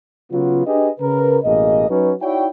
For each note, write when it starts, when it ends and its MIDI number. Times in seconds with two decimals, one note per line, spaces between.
0.31 0.63 49
0.31 0.63 54
0.31 0.63 59
0.31 0.63 65
0.66 0.89 62
0.66 0.89 67
0.66 0.89 68
0.66 0.89 71
0.66 0.89 75
1.00 1.38 49
1.00 1.38 70
1.00 1.38 71
1.44 1.88 33
1.44 1.88 47
1.44 1.88 58
1.44 1.88 68
1.44 1.88 75
1.88 2.12 54
1.88 2.12 61
1.88 2.12 63
1.88 2.12 66
1.88 2.12 71
2.21 2.47 63
2.21 2.47 64
2.21 2.47 66
2.21 2.47 73
2.21 2.47 74
2.21 2.47 79